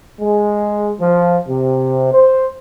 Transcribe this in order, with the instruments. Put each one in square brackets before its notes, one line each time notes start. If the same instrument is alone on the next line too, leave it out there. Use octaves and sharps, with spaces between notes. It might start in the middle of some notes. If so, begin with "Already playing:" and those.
[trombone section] G#3
F3
C3
C5